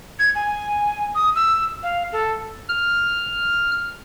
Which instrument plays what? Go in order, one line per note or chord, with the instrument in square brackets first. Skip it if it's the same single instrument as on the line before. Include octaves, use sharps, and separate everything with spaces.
[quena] G#6
G#5
D#6
E6
F5
A4
[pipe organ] F6